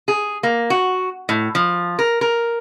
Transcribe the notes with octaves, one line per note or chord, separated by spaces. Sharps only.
G#4
A#3
F#4
A2
F3
A#4
A#4